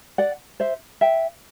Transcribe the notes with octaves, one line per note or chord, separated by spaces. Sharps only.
D5 F#5
C5 E5
E5 G5